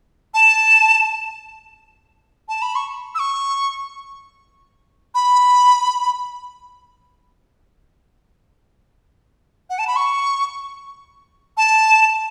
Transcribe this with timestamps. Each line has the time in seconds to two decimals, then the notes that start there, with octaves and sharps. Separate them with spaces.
0.34 A5
2.49 A5
2.62 B5
2.75 C#6
3.15 E6
3.19 C#6
5.15 B5
9.70 F#5
9.79 A5
9.87 B5
9.96 C#6
11.57 A5